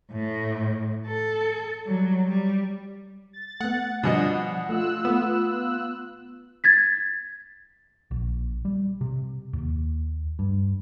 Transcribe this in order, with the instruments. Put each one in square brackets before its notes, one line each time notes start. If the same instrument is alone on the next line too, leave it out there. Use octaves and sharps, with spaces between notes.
[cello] A2
A4
F#3 G3
G3
[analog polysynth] A6
[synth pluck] A3 B3 [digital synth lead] F#5
[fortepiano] B2 D4 D#5 [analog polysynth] F3 [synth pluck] G3 G#5 C#7
[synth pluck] A3 [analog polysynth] F4 E6 F#6
[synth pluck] A3 E7 [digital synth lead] B3
[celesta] G#6 A6 B6
[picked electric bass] A#1
G3
C3
D#2
G2